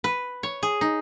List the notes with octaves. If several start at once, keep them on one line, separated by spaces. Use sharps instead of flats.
B4
C#5
G#4
D#4